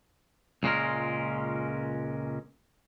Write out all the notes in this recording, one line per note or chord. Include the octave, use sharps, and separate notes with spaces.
C#2 A#2 G#3 C#4 A#4